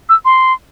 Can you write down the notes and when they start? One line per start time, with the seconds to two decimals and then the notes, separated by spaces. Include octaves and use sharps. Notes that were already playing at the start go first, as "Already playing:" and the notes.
0.09 E6
0.25 C6